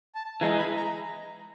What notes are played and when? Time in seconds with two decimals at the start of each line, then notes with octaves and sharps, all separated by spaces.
0.15 A5
0.41 E3 G#3 B3 D#4 G#4 A#5
0.58 B5
0.77 A#5